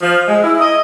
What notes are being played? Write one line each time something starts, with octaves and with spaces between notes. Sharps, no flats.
F3
G#3
E4
D#5